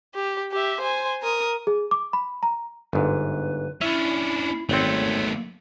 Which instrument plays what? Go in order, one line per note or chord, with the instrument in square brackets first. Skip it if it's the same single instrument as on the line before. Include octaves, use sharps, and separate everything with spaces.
[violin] G4
G4 E5
C5 G#5
A#4 D#6
[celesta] G#4
D6
B5
A#5
[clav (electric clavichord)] G1 G#2 [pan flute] B4
[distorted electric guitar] C#4 D4 [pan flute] E4 [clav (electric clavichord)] E5
[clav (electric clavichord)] G#1 C4 [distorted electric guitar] A3 B3 [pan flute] C#5